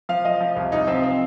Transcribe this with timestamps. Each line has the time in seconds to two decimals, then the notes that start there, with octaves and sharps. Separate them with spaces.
0.09 F3 F5
0.25 F3 D#5
0.41 F3
0.56 C2
0.72 C2 D#4
0.87 F3 C4
1.03 C4